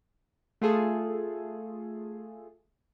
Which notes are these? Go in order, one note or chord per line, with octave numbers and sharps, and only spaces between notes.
A3 F4 G#4 A4